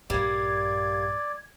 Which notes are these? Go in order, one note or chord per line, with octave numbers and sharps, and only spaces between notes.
A#1 G2 G3 A#3 D5 G#6